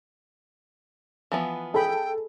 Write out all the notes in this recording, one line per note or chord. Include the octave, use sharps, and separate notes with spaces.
E3 F3 B3
G#4 A4 G5 B5